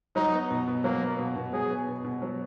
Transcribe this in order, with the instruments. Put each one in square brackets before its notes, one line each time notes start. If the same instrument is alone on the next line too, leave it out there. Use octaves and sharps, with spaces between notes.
[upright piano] F#3 [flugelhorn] D#4
[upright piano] B3
B2
B2
[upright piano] F#3 [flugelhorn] A#3
[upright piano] B3
B2
B2
[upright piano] F#3 [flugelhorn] G#4
[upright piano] B3
B2
B2
F#3